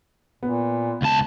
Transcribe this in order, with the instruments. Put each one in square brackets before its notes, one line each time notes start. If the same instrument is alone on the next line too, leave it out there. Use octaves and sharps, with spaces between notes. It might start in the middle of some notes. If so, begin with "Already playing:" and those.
[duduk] A#2 [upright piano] B3
[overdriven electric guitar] C#2 A5